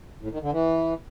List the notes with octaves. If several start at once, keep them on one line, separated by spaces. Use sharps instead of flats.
A2
D#3
D3
E3